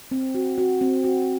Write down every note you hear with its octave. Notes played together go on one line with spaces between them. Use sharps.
C4
F#4
F#4
C4
F#4